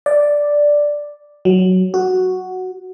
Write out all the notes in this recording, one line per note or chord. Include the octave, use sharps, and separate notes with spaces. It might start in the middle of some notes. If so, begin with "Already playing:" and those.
D5
F#3
F#4